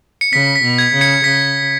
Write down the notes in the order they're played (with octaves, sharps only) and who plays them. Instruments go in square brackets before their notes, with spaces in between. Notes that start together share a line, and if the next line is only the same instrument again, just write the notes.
[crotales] C#7
[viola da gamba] C#3 [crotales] B6
[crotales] B6
[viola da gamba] B2
[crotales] G#6
[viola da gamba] C#3
[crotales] G#6 C#7
[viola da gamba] C#3 [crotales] B6